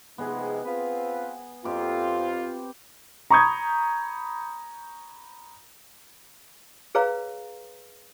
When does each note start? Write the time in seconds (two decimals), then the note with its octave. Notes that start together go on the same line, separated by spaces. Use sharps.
0.18 C3 F3 G#3 B3 D#4 G#4
0.66 C4 F4 B4
1.64 F2 C4 F4 G4 B4
3.30 A#5 B5 C#6 D#6 G6 G#6
6.95 G#4 B4 C#5 F5 A#5